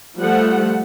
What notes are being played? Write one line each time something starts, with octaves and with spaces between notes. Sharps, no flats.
F3 G3 A3 F#5